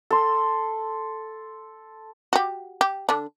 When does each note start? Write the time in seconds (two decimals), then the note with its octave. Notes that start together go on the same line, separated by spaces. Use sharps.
0.11 A4 C6
2.33 F#4 G4
2.81 G4
3.09 D3 D4